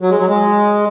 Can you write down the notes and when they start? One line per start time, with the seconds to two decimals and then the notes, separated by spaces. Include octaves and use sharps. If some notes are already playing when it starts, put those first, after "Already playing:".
0.01 F#3
0.10 G#3
0.19 F#3
0.28 G#3